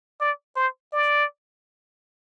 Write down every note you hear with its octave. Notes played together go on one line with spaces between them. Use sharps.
D5
C5
D5